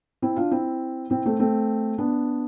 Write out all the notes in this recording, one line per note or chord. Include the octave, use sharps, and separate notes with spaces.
C4 E4
D4 F4
C4 E4
C4 E4
A3 C4
A3 C4
B3 D4